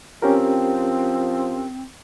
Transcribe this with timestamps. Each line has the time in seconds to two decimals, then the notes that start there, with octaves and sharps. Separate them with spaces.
0.22 F3 C4 C#4 G4 A#4